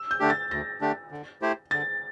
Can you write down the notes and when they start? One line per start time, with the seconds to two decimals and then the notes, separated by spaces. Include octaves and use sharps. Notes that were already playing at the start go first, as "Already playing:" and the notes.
Already playing: E6
0.11 G6
0.20 D3 A3 D4 G4
0.30 A6
0.51 D2 A#6
0.81 D3 A3 D4 G4
1.11 D3
1.42 A3 E4 G4 C5
1.71 D3 A6